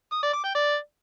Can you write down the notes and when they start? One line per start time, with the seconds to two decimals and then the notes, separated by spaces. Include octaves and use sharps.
0.12 D#6
0.23 D5
0.34 D6
0.44 G5
0.55 D5